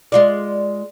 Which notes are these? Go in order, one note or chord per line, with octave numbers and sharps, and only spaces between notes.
G#3 F4 D5